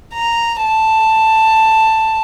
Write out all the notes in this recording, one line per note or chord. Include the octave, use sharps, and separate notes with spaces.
A#5
A5